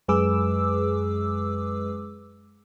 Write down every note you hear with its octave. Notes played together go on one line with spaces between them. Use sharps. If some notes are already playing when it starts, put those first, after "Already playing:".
F#2 G#3 G#4 B4 D6 E6